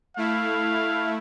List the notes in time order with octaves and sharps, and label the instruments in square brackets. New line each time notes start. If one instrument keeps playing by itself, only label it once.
[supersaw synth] A3 E4 [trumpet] F5